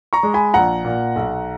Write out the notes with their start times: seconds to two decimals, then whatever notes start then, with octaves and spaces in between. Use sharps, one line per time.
0.13 A#5 C#6
0.23 G#3
0.34 G#5 B5
0.54 A#1 F#5 A#5
0.85 A#2
1.16 B1